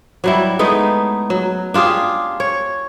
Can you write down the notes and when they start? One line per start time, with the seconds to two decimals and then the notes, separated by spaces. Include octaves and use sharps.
0.24 F#3 G3 E4
0.59 G#3 A3 B3 D#4
1.30 F#3
1.74 D4 F4 G4 G#4
2.40 C#5